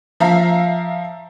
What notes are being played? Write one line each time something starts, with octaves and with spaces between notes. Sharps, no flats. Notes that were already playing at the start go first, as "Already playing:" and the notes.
F3 E5 F5 A#5